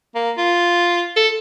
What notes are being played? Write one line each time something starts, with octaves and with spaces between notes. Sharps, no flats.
A#3
F4
A4